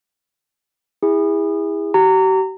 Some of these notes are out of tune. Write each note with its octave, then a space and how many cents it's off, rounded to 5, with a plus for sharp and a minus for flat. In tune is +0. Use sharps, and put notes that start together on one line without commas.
E4 -10 G#4 -30
G4 -45 A#5 -25